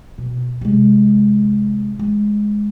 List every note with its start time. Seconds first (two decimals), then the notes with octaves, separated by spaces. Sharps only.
0.18 B2
0.61 C3 G#3
1.99 G#3